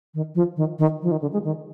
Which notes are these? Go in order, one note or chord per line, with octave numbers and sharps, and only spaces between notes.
D#3
F3
D#3
D#3
F3
D#3
D3
G#3
D#3